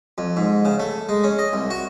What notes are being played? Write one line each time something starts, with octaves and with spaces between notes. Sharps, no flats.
F2
G#2
C#3
A3
G#3
C#4
D#5
C2
F#4